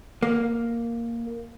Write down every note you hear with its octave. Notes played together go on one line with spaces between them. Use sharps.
A#3